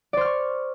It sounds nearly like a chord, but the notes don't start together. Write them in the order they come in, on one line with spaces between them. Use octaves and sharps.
D5 C5 F6 C#6